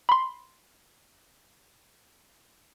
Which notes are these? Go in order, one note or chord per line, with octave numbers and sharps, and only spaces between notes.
B5 C6